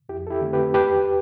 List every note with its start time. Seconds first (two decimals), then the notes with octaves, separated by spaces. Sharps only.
0.09 F2 E4 G4
0.27 A4
0.31 E4 G4
0.42 D3 A3 C4
0.53 G4 B4
0.74 E2 G4 B4